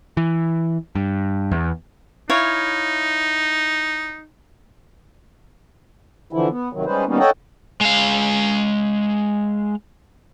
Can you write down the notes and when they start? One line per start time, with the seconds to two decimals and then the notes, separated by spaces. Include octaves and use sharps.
0.17 E3
0.95 G2
1.51 E2
2.30 D#4 E4 C#5 F5
6.33 D3 E3 F3 E4
6.50 B3
6.73 C3 D#3 F#3
6.86 G3 G#3 C#4 D#4 B4 C5
7.07 D#3 G3 A#3 B3 C#4 D#4
7.19 A4 C#5 D#5 F#5 G5 A5
7.81 G#3 F5